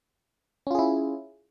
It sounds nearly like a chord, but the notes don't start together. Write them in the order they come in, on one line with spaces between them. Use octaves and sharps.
C#4 F4 G#4 E4